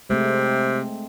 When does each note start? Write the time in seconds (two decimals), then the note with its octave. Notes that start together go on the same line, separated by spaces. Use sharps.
0.10 C3 G#3 A3 C4